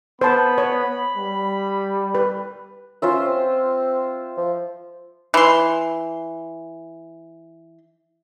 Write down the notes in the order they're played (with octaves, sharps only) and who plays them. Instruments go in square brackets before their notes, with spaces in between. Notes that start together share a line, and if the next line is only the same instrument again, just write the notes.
[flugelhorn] B3 [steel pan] C5 A5 [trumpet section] B5
[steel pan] C#5
[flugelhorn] G3
[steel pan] B4
[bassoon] C#4 [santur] F4 C5 E5
[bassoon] C4
F3
[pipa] E3 C6